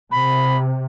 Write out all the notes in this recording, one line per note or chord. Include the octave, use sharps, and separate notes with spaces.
C3 B5